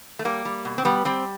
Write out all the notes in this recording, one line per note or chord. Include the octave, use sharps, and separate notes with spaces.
A3
G3 A#3
G3
B2
C4
G3 B3
G3 C4